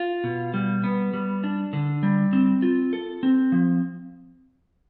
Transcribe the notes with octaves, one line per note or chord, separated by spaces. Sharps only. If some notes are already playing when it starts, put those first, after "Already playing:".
Already playing: F4
B2
G3
B3
G3
D4
D3
G3
C4
F4
A4
C4
F3